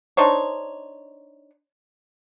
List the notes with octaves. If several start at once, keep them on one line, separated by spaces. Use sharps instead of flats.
D4 D#4 C5 C#5